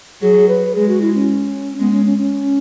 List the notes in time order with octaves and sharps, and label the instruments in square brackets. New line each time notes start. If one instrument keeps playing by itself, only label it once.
[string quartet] F#3 [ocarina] G#4
[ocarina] B4
[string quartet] G#3 [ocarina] G#4
[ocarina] F#4
E4
C#4
[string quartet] G#3 [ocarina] B3
[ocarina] C#4
C#4
C#4